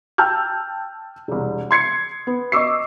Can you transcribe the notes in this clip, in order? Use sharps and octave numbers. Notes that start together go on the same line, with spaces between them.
G5 A5 E6 F6 G6
E1 C2
C6 G#6 C7 C#7
B3
D#5 C#6 D6 E6 C7